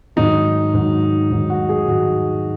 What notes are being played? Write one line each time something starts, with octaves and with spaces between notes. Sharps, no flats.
G#2 D#3 F#3 D#4
G#2 D#3 F#3
G#2 D#3 F#3
F#4
G#4
G#2 D#3 F#3 F#4